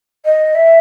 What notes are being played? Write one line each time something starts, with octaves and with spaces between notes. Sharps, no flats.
D#5
E5